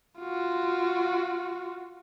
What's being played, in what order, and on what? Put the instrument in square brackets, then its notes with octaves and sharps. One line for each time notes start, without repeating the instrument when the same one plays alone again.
[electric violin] F4 F#4